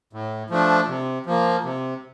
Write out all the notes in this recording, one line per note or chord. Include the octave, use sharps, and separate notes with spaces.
A2
F3 A3 D4
C3
F3 A#3
C3